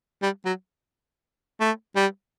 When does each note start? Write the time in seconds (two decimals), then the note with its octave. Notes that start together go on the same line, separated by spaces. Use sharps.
0.22 G3
0.45 F#3
1.60 A3
1.96 G3